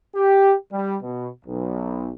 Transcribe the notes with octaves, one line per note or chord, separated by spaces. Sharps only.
G4
G3
B2
B1